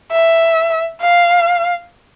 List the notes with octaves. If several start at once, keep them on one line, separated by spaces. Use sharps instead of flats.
E5
F5